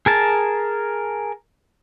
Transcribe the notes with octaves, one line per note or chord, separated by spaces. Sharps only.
G#4 A#4 A5